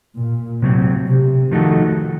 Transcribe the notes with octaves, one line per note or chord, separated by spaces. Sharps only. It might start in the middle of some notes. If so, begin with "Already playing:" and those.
A#2
A2 C3 F#3 C4
C3
D#3 F3 A3 D#4 F#4 A4